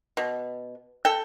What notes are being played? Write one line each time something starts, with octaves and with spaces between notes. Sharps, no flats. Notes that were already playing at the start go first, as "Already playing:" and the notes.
B2
A4 G5